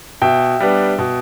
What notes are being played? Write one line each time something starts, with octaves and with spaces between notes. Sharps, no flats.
B2 E5 G5
G3 B3 D4
B2